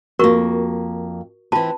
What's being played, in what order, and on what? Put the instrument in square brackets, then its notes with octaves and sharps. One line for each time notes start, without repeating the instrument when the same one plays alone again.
[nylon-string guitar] F2 A#3 [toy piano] F#4 A#4 C#6
[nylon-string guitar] E3 C4 [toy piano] F4 A5